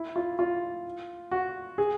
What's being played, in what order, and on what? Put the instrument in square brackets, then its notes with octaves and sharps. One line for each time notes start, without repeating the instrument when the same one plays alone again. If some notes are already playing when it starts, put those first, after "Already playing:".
Already playing: [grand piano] E4
F4
F4
F#4
G#4